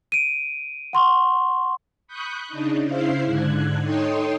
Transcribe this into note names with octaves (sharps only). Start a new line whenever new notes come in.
D7 D#7
F#5 C6 C#6
B5 C#6 D#6 F#6 G6
C#3 D4 D#4
C#3 E4 C5 F5 C6
G#2 D3 F#6 G#6
D#4 A4 C#5 G5 C6 D#6